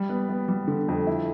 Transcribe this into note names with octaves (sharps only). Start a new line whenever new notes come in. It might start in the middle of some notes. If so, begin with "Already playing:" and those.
Already playing: G3
B3
B3
G3
D3
F2
E4